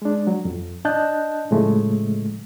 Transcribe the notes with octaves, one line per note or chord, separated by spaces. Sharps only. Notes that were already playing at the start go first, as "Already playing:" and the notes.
G#3 D4
F#3
F2
D4 D#5 A5 F#6 G6
A2 C#3 F3 G#3 A3